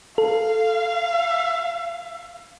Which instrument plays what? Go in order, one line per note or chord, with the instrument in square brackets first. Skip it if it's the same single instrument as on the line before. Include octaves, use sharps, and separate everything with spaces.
[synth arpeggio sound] A4 [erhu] F5